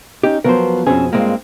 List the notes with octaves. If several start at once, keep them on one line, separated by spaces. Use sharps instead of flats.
C#4 D#4 G4
F3 F#3 B3 A#4 C5
F2 B2 C4 C#4 G#4 C5
G2 G#3 A#3 C4 F4